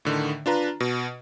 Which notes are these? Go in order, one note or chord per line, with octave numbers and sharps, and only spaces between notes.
A2 D3 D#3
D4 F4 B4 A#5
B2